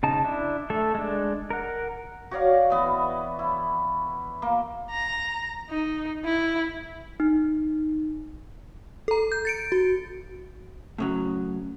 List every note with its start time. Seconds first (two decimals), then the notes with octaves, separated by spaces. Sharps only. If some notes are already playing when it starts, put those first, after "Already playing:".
0.03 C#3 D#4 A5
0.24 D4 E4
0.70 A3 A4 E5
0.94 G#3 D4
1.50 A#4 F#5
2.31 F#4 C#5 D5 F5
2.70 E3 B3
3.39 E4
4.42 A#3
4.90 A#5
5.70 D#4
6.24 E4
7.20 D#4
9.08 A4 A#5
9.32 G6
9.45 A6 C#7 D7
9.72 F#4
10.98 A2 C#3 F#3